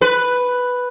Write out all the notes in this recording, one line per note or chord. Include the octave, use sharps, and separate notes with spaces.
B4